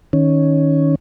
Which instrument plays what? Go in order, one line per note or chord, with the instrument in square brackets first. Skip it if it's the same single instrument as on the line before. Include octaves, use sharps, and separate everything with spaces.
[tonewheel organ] D#3 C#4